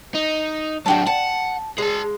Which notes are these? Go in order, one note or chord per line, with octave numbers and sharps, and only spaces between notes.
D#4
F#3 D4 F#4 G5 A5
F#5 A5
G#3 G#4 A5